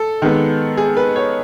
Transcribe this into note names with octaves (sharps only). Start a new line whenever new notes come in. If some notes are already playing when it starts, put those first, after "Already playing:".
Already playing: A4
D#3 G#3 B3
G#4
B4
C#5